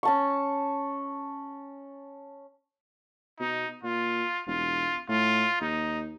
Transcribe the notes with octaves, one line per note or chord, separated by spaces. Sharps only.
C#4 A5 C#6
B2 D#4
A#2 F4
E1 F4
A2 F4
D#2 D#4